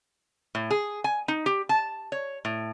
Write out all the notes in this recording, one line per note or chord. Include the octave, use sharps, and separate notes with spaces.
A2
G#4
G#5
D#4
G4
A5
C#5
A2